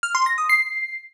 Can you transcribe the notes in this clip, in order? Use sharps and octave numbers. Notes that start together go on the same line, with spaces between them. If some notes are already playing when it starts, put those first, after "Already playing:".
F6
C6
A#6
D#6
C7